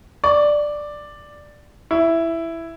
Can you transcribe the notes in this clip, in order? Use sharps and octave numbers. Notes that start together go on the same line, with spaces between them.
D5
E4